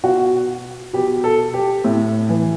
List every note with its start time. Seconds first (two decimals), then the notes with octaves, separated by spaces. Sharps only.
0.03 B2 F#4
0.93 B2 G4
1.24 A4
1.54 G4
1.85 A2
2.29 E3